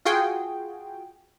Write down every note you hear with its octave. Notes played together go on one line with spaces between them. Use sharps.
F4 F#4 G#4 G5